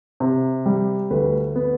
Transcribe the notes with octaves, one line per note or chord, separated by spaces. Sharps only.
C3
G3
D2 B4
B3